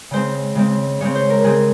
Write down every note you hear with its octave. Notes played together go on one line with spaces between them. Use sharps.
C#3 G#3 C4 C5
C#3 G#3 C4
C#3 G#3 C4 C#5
C5
A#4
C#3 G#3 C4 G#4